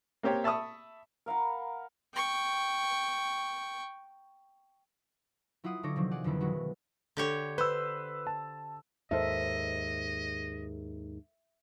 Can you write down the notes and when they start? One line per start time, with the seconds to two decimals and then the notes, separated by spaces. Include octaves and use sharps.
0.23 A#3 C4 G4 C#5
0.44 E5 A5 B5 C#6 D#6
1.26 A#4 F5 F#5 B5
2.14 G5 C#6
5.64 F#3 E4 F4 F#5 D#6
5.83 D3 D#4 A4 C#5 D6 A#6
5.96 C3 D#3 F3 F#3
6.11 G#4 D5 F#5
6.24 F2 D3 D#3 B3 E4
6.41 B2 D#3 F#3 G#3 E4 F#4
7.17 D3 G4 C#5
7.58 B4 C5 E6
8.27 A5
9.11 D#2 G#2 A4 A#4 C5 D#5 E5